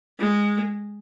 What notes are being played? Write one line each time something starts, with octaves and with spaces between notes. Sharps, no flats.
G#3